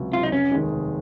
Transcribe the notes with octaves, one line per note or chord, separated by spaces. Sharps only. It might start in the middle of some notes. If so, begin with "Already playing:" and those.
Already playing: C#2 C3 F#3
C3 F#3 F4
D#4
F1 C#4
D#2 D#3 G#3
F1